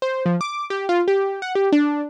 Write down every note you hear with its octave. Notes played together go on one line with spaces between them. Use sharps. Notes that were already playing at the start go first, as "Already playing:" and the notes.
C5
F3
D6
G4
F4
G4
F#5
G4
D4